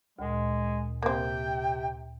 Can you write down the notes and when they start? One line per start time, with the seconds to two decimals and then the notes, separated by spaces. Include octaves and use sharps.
0.19 D2 A#2 G#3
1.03 C3 A#3 C4 G5